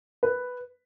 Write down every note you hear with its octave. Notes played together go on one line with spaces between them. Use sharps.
B4